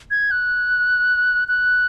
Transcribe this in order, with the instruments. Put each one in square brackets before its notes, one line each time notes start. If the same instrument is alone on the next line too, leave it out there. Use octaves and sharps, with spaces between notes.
[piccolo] G#6
F#6
F#6